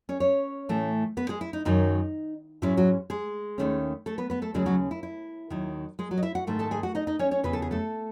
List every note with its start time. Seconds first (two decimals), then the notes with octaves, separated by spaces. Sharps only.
0.09 C#4 C#5
0.20 C#4 C#5
0.69 A2 E3 A3
1.17 B3 B4
1.29 G#3 G#4
1.41 E4
1.53 D#4
1.65 F#2 D#3 F#3 D#4
2.62 G#2 F#3 C#4 E4
2.77 F#3 F#4
3.10 G#3 G#4
3.58 D#2 D#3 A3 C#4
4.06 A3 A4
4.18 B3 B4
4.30 B3 B4
4.42 A3 A4
4.54 D#2 C#3 F#3 G#3 C#4 G#4
4.66 F#3 F#4
4.91 E4
5.03 E4
5.50 D#2 D#3 F#3
5.99 G#3 G#4
6.11 F#3 F#4
6.18 D#5
6.23 E4 E5
6.35 F#4 F#5
6.47 G#2 D#3 A3
6.59 A4 A5
6.71 G#4 G#5
6.83 F#4 F#5
6.95 D#4 D#5
7.07 D#4 D#5
7.19 C#4 C#5
7.31 C#4 C#5
7.43 E2 C#3 E3 B3 B4
7.53 A4
7.62 G#4
7.71 A3 A4